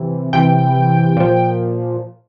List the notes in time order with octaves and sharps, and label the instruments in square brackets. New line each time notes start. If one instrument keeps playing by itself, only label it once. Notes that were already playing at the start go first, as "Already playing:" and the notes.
Already playing: [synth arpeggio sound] C3 E3
C3 E3 G5
A#2 F3